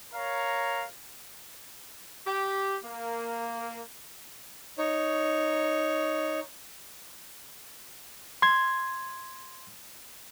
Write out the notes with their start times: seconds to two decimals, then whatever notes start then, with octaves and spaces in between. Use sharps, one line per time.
0.14 A#4 C#5 F5 A#5
2.27 G4
2.85 A#3
4.78 D#4 C#5
8.42 C6 G#6